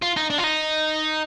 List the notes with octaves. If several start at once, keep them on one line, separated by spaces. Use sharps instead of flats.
F4
D#4
D4
F4
D#4